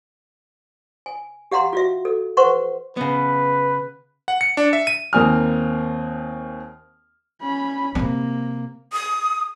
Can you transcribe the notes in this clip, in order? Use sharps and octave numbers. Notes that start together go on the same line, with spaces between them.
G#5
G4 F5 F#5 A#5 C6
F4 F#4 E5
A4
B4 C5 F#5 C6 C#6
C#3 B3 B4
F#5
C#7
D4
E5
D#7
D#2 A#3 C4 G#5 D#6 F6
C#4 B5
C3 A#3 C4
D#6